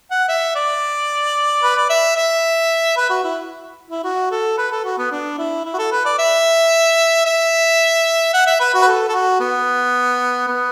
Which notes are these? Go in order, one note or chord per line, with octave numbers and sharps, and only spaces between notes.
F#5
E5
D5
B4
D5
E5
E5
B4
F#4
E4
E4
F#4
A4
B4
A4
F#4
B3
D4
E4
E4
F#4
A4
B4
D5
E5
E5
F#5
E5
B4
F#4
B4
A4
A4
F#4
B3
B3